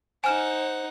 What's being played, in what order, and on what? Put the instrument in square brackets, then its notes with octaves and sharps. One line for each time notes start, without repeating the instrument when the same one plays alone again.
[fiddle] D#4 F#5 [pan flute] C5 [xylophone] G#5 F6 E7